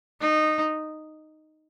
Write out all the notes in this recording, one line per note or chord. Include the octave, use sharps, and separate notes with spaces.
D#4